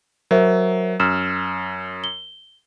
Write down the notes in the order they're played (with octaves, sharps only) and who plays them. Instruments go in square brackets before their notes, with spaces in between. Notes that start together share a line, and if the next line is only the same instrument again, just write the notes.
[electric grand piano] F#3 [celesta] A#4 C5 E5
[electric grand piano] F#2 [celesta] E6 F6 E7
[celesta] G7